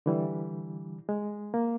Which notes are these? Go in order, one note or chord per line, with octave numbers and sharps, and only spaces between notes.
D3 E3 G3
G#3
A#3